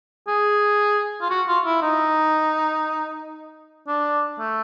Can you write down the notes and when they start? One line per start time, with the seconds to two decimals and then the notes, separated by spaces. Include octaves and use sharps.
0.27 G#4
1.21 F4
1.30 F#4
1.48 F4
1.65 E4
1.82 D#4
3.87 D4
4.39 A3